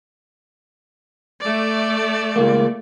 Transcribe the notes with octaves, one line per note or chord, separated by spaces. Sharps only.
A3 D5
C#2 A#3